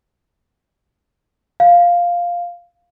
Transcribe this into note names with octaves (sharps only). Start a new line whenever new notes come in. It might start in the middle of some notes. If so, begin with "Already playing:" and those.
F5